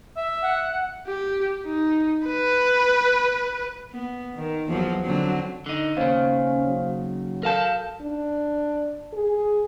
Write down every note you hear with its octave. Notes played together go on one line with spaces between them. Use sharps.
E5
F#5
G4
D#4
B4
B3
D#3
E2 F3 F#3
D3 F#3 C4
D3 D#4
D#2 C#3 C#4 C5 F5
F#3
A4 A#4 F5 A5 G6
D4
G#4